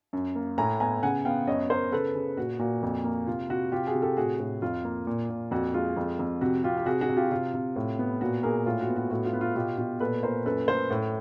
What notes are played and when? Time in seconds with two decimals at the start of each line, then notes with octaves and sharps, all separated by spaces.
0.13 F#2
0.35 A#3
0.58 A2 G#5 A#5
0.80 B3 G#5 A#5
1.03 C#3 F#5 G#5
1.25 B3 F5 G5
1.47 F#2 C#5 D#5
1.70 F#2 A#4 C5
1.92 C#3 A4 B4
2.15 C#3
2.37 A#2 F#4
2.59 A#2 F#4
2.83 F2
3.04 A#3
3.27 C3 F4
3.50 C3 F#4
3.72 C3 F4 G4
3.87 F#4 G#4
3.94 C3
4.02 G4 A4
4.17 A2 F#4 G#4
4.40 A2 F#4
4.62 F2 F4
4.84 A#3
5.07 A#2
5.30 A#2
5.51 F2 F#4
5.74 G#3 F4
5.97 F2
6.19 F2
6.41 C3 F#4
6.64 C3 F4 G4
6.77 G4
6.86 C3 F#4 G#4
7.01 F#4 G#4
7.09 C3
7.17 F4 G4
7.31 C3 F4
7.54 C3
7.76 A2
7.99 B3
8.21 A#2 F#4
8.43 A#2 G#4 A#4
8.66 A2 F4
8.81 F#4
8.88 B3
8.96 F#4
9.10 A2 F#4
9.25 F4
9.33 B3
9.41 F4
9.56 B2 F4 G4
9.78 B2 F4 G4
10.00 A#2 A4 B4
10.23 A#2 A#4 C5
10.46 F#2 A4 B4
10.67 A3 A#4 C5
10.90 A2